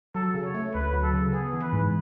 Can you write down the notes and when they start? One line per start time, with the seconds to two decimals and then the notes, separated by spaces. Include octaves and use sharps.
0.15 F#3 A4
0.34 C#3
0.44 C#5
0.54 A3
0.74 D2 B4
0.93 F#3
1.03 A4
1.13 C#3
1.33 B3 G#4
1.53 E3
1.62 B4
1.73 G#2